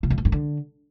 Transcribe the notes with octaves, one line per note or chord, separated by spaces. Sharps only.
C3
F2
B2
G2
D3